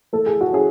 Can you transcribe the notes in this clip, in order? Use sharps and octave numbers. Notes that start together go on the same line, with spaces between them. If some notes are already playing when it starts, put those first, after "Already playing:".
A3 A4
G#4
F#4
C#4 G#4